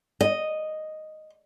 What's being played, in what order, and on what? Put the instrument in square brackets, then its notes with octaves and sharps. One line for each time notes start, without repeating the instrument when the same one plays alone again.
[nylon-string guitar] D#5